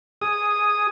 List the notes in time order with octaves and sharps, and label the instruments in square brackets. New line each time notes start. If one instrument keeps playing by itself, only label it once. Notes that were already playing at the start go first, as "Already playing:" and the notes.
[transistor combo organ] G#4 D#6